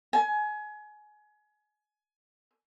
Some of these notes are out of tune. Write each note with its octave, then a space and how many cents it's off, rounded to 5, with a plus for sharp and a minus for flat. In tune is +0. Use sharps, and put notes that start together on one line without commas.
G#5 +25